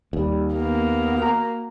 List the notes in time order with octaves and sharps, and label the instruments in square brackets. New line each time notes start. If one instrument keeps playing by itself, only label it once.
[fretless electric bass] D#2 [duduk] G3
[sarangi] A#3 [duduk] B3
[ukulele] F#4 A#4 A#5